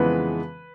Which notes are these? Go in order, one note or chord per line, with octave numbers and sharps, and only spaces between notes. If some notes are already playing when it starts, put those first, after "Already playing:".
Already playing: F2 C#3 E3 G#3 B3 B4